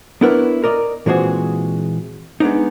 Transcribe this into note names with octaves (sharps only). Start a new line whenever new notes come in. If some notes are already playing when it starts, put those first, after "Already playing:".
B3 D4 E4 A#4 B4 C#5
A#4 D5 D#5
A#2 E3 G#3 C4 F#4 G#4
G#3 B3 D4 D#4